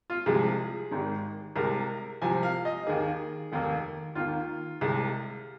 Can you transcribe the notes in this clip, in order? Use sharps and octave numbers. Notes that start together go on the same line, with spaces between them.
F4
C2 C3 F3 G#3 G#4
G#1 G#2 D#3
C2 C3 G#3 A#4
C2 C3 F3 G#5
F5
D#5
D#2 D#3 A#3 G#4
F1 D#2 D#3 A#3
D#2 D#3 A#3 F4
C2 C3 G#3